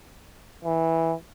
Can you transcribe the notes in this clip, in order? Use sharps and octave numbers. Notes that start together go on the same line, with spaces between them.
E3